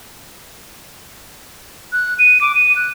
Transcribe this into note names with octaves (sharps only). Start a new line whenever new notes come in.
F#6
D#7
D6
D#7
F#6